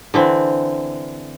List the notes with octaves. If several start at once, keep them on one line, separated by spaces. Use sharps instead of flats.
D3 E3 C4